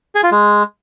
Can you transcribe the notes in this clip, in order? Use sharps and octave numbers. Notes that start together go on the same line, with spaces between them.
G#4
F4
G#3